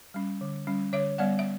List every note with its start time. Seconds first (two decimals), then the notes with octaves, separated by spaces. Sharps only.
0.14 G3 C#4
0.41 D3
0.67 G3 C#4
0.93 D3 C#5 E5
1.18 G3 B3 D5 F#5
1.39 E5